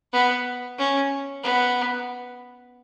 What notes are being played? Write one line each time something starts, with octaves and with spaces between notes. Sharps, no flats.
B3
C#4
B3